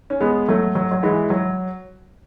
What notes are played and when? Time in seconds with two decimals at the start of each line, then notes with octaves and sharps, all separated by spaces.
0.10 C#4
0.21 G#3 B3
0.48 F#3 A3
0.75 F#3
0.92 F#3
1.03 E3 G#3
1.30 F#3